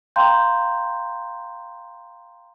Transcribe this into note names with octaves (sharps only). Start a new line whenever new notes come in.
F5 G5 A#5 C6 G6